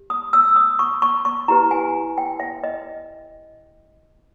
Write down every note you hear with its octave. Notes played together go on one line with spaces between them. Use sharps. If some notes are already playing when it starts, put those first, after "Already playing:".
Already playing: G4
D#6
E6
D#6
C#6
C#6
C#6
E4 G4 B4 A#5
G#5
G5
E5
D#5